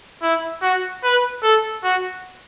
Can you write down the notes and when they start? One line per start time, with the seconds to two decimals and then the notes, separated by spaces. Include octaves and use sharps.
0.22 E4
0.62 F#4
1.03 B4
1.43 A4
1.84 F#4